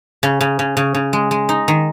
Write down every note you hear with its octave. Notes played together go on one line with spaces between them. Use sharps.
C#3
C#3
C#3
C#3
C#3
G#3
G#3
D#4
D#3